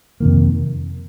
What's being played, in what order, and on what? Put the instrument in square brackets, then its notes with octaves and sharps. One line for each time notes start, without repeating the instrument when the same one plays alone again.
[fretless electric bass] F2 C3 D#3 A#3